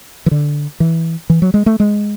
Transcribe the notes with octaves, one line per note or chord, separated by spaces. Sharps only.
E3
D3
E3
E3
F#3
G#3
A3
G#3